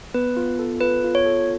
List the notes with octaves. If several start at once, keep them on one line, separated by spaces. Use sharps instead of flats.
B3 B4
F4
A4
F4 B4
F4
C#5
A4